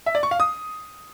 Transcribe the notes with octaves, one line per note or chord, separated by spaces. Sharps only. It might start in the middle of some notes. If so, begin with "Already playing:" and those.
E5
D5
C#6
F5
D#6